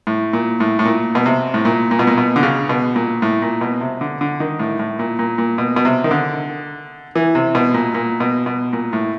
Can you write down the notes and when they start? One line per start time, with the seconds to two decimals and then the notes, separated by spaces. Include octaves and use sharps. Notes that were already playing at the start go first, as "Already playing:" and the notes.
0.07 A2
0.33 A#2
0.60 A2
0.79 A2
0.85 A#2
1.15 B2
1.26 C3
1.54 A2
1.65 A#2
1.91 A#2
1.99 B2
2.07 A#2
2.18 B2
2.36 D3
2.43 C#3
2.69 B2
2.96 A#2
3.22 A2
3.42 A#2
3.61 B2
3.81 C3
4.01 D3
4.21 D3
4.40 D#3
4.59 A2
4.79 A2
4.99 A#2
5.19 A#2
5.38 A#2
5.58 B2
5.76 B2
5.85 C3
6.04 D#3
6.11 D3
7.16 E3
7.35 C3
7.55 B2
7.74 A#2
7.95 A#2
8.20 B2
8.46 B2
8.73 A#2
8.93 A2